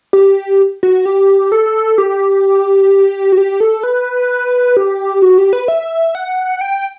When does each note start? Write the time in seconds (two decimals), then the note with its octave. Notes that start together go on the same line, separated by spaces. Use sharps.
0.13 G4
0.83 F#4
1.06 G4
1.52 A4
1.98 G4
3.32 F#4
3.38 G4
3.60 A4
3.83 B4
4.77 G4
5.22 F#4
5.38 G4
5.53 B4
5.68 E5
6.15 F#5
6.61 G5